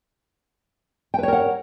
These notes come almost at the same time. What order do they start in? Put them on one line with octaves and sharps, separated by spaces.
G5 B4 C#5 A#4 F#5